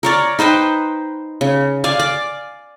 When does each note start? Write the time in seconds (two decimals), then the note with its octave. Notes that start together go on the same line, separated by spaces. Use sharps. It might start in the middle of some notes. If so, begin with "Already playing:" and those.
0.03 A#4 C#5 D5
0.39 D#4 B4 C5 G5
1.41 C#3
1.84 D5 F5 G#5
1.99 D5 D6